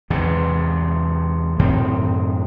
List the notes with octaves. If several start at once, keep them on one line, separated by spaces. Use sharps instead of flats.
E2 G#2 C3
F#2 A2 D#3 C4